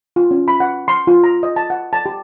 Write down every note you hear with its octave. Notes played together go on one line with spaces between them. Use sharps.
F4
C#4
B5
F#5
C6
F4
A#5
D#5
A5
F#5
A5
G4